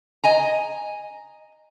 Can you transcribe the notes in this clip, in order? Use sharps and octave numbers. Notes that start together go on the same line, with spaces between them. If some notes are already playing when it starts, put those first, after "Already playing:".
D#5 G#5 A#5